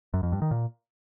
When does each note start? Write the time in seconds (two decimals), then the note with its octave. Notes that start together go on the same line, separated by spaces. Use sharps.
0.14 F#2
0.23 F2
0.32 G2
0.42 D#3
0.51 A#2